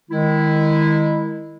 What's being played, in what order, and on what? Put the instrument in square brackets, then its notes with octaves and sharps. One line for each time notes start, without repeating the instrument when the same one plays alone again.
[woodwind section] D#3 G#3 E4